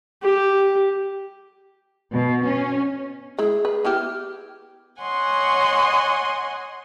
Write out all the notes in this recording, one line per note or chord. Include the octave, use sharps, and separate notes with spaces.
G4
B2
C#4
G#3 E4 G#4
B4
B3 E4 G4 F6
C#5 D#5 F#5 G#5 C6